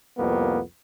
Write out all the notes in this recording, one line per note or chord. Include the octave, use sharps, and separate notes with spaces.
C2 F2 A#3 B3